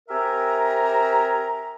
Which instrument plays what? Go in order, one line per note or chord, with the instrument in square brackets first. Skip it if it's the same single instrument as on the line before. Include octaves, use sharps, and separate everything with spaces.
[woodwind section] C4 G4 A#4 E5 G#5 A#5